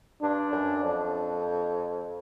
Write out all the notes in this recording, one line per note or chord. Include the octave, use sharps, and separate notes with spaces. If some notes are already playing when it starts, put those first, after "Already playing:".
G2 D4
F#2
F2